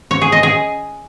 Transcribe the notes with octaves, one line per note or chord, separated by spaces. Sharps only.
C#5
G#4
D#5
G#4